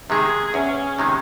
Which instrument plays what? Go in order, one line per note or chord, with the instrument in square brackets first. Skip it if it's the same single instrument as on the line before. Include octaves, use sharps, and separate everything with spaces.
[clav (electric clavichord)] C3 D#3 G#3 [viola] G#4
[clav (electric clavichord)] E2 [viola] C#4
[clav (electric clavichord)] C3 D#3 G#3